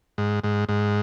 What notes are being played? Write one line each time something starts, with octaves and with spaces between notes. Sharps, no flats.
G#2
G#2
G#2